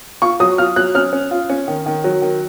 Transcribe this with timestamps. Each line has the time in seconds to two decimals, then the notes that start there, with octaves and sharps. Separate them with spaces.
0.22 F4 C#6
0.40 F#3 D#6
0.58 F4 F6
0.76 F#3 F#6
0.95 C#4 F6
1.13 C#4
1.31 F4
1.50 C#4
1.68 D#3
1.86 D#3
2.04 F#3
2.22 D#3